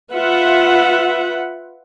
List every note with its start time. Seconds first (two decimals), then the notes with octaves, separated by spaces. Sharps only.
0.12 F4 B4 E5 F#5